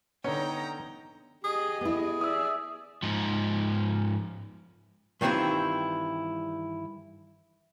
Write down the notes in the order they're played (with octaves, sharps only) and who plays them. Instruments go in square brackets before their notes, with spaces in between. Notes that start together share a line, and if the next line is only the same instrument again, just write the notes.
[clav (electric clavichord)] D3 B3 [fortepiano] C#4 [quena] D#4 [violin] G5 A#5
[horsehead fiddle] G4 D#5 [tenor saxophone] G#4
[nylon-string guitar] B3 E4 [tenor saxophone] G#4
[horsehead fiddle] D5 E5 [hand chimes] D#6 E6
[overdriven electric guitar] G#2 F3
[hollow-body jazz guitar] G2 D#3 E3 C4 E4 F4